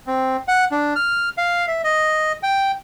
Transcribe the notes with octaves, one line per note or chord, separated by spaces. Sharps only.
C4
F#5
D4
F6
F5
E5
D#5
G5